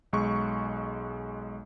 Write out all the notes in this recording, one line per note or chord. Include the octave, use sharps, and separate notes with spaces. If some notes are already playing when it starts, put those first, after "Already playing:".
B1 G#3 C#6